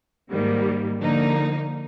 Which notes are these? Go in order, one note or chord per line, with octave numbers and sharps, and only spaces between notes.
G#2 D#3 G3 A#3
D3 F3 A#3 D#4